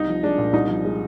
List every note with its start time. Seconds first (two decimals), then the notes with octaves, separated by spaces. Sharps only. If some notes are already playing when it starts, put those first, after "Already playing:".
Already playing: C2 D#4
0.08 F3
0.23 G#3 D4
0.38 A#2
0.53 C2 D#4
0.69 F3
0.85 G#3